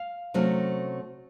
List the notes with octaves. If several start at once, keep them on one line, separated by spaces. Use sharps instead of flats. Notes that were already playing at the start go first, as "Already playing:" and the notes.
Already playing: F5
C3 F#3 A3 C#4